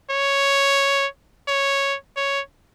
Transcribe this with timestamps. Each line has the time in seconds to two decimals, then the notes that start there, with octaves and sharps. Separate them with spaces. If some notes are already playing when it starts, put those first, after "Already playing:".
0.11 C#5
1.48 C#5
2.16 C#5